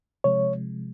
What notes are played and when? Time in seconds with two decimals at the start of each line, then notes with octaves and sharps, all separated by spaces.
0.24 C3 F3 G#3 C#5